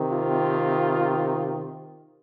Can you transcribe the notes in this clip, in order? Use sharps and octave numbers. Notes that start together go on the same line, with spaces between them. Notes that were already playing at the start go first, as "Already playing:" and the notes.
Already playing: C3 D#3
F4